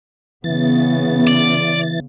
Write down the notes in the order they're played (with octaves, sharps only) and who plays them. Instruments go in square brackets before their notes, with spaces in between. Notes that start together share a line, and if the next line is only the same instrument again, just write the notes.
[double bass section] C#3 B3 [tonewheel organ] E3 A6
[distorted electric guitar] D5